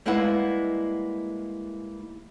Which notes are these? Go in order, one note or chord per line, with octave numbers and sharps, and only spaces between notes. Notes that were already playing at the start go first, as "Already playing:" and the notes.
G3 G#3 A#3 B3 E4 F#5